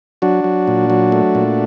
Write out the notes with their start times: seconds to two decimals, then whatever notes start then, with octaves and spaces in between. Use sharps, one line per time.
0.22 F#3 D4 F#4
0.44 F#3
0.68 A#2
0.90 F#3
1.12 A3
1.35 A#2